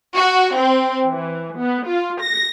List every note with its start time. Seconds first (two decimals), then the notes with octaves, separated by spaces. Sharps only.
0.15 F#4
0.56 C4
1.09 E3
1.57 B3
1.87 F4
2.21 A#6